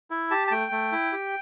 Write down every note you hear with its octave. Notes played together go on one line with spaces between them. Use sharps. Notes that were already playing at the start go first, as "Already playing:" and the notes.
E4
G4 A5
A5
A3 G5
A3
E4
G4